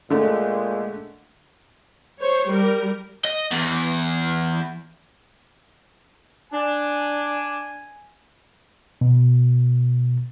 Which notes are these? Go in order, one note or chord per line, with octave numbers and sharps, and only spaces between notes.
A#2 D3 G#3 A3
C5 C#5
G3 A#4
D#5
E2
D4 G#5
B2